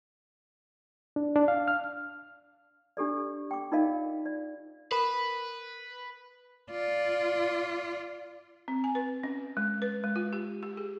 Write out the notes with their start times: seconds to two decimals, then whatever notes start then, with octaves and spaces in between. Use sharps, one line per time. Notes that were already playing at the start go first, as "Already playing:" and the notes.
1.16 D4
1.36 D4
1.48 F5
1.68 F6
2.97 D4 G4 A4 D5
3.51 G5 D6
3.72 D#4 F4 A#4 D5 D#5 F5
4.26 D5
4.92 A#4 B4 B5
6.71 F4 D5
8.68 C4
8.84 G#5
8.95 B4
9.23 C#4
9.57 G#3
9.82 B4
10.04 G#3
10.16 F4
10.33 G4
10.63 G4
10.77 G#4